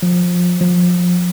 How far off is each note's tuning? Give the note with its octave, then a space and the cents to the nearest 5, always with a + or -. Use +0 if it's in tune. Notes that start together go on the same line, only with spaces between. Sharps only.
F3 +20
F3 +25